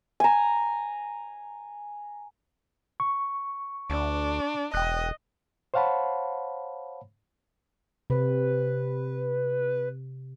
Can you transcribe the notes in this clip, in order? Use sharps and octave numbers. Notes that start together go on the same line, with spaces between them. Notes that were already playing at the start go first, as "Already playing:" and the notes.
G#5 A#5
C#6
D2 D4
E1 D#5 G5 F#6
C5 C#5 F5 F#5 A5 B5
C3 B4